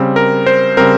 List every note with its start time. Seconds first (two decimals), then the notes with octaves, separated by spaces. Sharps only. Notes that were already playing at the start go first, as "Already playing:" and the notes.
Already playing: C#3 G3 C4
0.16 A#4
0.46 C5
0.77 C#3 G3 C4 A#4